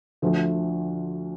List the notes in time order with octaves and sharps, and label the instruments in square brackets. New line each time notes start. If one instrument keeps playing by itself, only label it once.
[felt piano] D2 D3 F3 A3